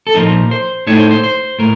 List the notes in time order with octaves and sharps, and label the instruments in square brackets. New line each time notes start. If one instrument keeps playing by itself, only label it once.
[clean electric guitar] A4
A#2 F3 C4 D#4 A#4
C5
A2 A3 C4 D#4 C#5
C5
C5
C5
A2 A#4